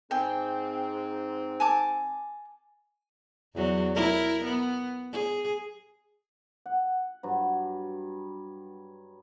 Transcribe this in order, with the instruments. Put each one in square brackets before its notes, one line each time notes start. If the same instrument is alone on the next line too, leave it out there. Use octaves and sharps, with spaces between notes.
[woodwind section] G#2 C4 [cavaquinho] G5 G#5
[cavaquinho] G#5 A5 D6
[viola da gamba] E2 F#3
E4 A#4
B3
G#4
[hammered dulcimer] F#5
G2 F#3